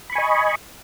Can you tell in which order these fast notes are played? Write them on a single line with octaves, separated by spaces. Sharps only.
B5 C#6 G#5 D#5